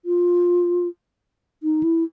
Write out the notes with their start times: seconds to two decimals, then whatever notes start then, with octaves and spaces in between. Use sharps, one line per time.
0.05 F4
1.63 D#4
1.83 E4